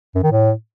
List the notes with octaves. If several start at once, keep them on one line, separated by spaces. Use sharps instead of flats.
F#2
D#3
A2